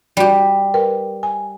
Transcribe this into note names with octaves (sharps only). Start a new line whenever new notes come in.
G3 F#4 G4 D5
A#4 B4 G5
G#5